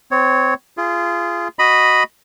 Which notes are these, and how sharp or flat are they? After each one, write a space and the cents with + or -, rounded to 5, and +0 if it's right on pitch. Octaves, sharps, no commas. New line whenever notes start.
C4 -20 C#5 +0
F4 -25 G#4 +0
F#4 +0 D#5 -5 B5 +0